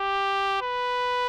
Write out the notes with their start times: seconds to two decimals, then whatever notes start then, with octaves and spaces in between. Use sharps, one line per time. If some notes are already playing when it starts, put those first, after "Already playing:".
Already playing: G4
0.62 B4